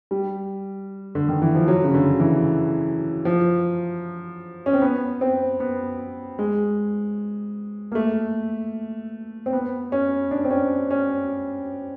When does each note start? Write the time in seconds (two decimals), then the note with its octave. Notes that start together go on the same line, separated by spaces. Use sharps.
0.11 G3
1.15 D3
1.29 D#3
1.42 E3
1.55 F3
1.68 F#3
1.84 C#3
1.94 D3
2.20 E3
3.25 F3
4.66 C#4
4.73 C4
4.82 B3
5.21 C4
5.60 B3
6.39 G#3
7.92 A#3
7.95 A3
9.46 C4
9.53 B3
9.92 C#4
10.31 D4
10.45 C4
10.51 C#4
10.91 C#4